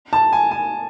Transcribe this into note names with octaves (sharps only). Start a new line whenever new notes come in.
A5
G#5
G#5